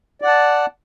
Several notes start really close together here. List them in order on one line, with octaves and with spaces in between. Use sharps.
D5 F#5 A5